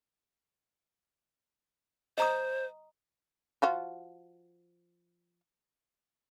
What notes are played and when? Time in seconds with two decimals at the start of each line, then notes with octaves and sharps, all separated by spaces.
2.18 C5 D#5 A#5 D#6
3.62 F3 F4 F#4